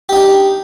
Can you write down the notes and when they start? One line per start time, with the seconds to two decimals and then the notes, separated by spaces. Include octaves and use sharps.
0.09 G4
0.13 D#4
0.16 D4